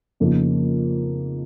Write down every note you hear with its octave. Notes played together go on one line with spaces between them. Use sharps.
F2 C#3 F3 A#3 D#4